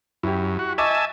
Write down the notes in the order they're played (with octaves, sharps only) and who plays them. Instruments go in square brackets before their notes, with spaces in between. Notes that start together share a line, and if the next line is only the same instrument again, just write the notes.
[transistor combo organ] F#2 [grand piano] E4 G4
[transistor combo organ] F#4
[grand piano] D#5 C#6 D6 [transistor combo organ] E5 G#5 A5